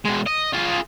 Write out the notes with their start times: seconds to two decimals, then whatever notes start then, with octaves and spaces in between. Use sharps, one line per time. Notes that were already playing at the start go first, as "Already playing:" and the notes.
0.05 B2 G#3
0.26 D#5
0.53 F4 G#4